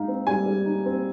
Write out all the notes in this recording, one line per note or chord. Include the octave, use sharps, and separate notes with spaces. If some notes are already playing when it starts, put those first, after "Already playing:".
Already playing: G#2 D#4 F5
C4
G3 G#5
G3
D#4
C4